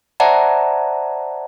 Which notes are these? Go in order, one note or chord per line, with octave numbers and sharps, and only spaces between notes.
C5 D5 E5 F#5 A5 A#5